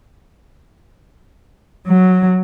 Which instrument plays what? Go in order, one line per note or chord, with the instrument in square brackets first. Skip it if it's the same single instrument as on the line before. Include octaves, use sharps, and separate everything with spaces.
[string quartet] F#3